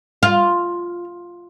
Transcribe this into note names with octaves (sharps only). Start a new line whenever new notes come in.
F4